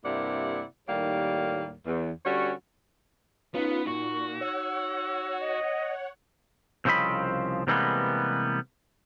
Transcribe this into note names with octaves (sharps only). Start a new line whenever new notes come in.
G2 C3 A#3 E4 D5 F#5
D#2 A2 D#3 G3 A#3 C#5
E2
D3 G3 C#4 F#4 C#5
B3 C#4 D#4 F4 B4 C#7
A#2 D#4 F#4 C#6
C#5 F#5 E6
D#5
C2 C#3 F3 C4 D#5 B5
C3 E3 G3 G#3 A#3 B3